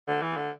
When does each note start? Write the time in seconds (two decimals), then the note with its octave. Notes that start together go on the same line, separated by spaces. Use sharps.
0.08 D3
0.22 E3
0.37 D3